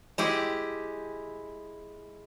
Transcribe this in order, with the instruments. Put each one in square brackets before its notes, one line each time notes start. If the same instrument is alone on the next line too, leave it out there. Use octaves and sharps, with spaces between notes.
[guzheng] G#3 E4 G4